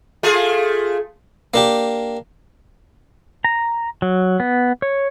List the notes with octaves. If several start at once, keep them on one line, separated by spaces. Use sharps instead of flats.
A3 F4 G#4
A#3 D4 G4
A#5
F#3
B3
C#5